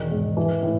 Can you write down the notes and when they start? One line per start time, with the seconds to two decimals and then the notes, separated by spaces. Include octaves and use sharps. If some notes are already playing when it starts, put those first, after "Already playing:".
Already playing: E1 D#3
0.11 G#2
0.37 E3
0.63 A2